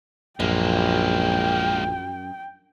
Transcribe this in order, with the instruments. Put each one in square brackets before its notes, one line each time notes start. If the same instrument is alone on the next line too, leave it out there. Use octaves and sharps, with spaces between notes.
[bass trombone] A#1 [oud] F#2 [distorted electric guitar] G#3 A#3 [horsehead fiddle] G5